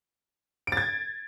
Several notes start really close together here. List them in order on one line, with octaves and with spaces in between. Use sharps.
D7 A6 G#6